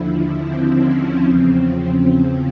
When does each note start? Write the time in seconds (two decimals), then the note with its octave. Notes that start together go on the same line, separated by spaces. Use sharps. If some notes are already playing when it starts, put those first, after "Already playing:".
Already playing: D#2 D3 F3 E4
0.44 C4
0.84 C#4
1.23 E2 C#3 F3 C4
2.03 C4